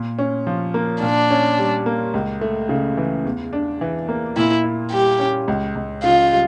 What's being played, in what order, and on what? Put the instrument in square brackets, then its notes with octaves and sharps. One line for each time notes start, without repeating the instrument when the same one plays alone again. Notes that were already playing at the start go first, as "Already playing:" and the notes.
Already playing: [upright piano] A#2
C#4
F3
A#3
[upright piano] A#2 [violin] D4
[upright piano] C#4
G3
A#3
C#2
A3
C#3
E3
E2
D4
E3
A#3
[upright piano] A#2 [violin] E4
[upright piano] E4
[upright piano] G3 [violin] G4
[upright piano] C#4
C#2
C#2
[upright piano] C#3 [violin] F4
[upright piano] G3